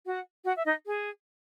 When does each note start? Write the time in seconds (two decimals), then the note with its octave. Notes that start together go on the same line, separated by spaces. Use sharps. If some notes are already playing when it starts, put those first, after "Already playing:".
0.06 F#4 F#5
0.46 F#4 F#5
0.56 E5
0.65 D#4 D#5
0.86 G#4